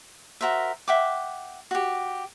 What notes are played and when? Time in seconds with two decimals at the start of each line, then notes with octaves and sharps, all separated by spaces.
0.41 F#4 A#4 C5 E5
0.88 E5 F#5 G5 D6
1.71 F#4 G4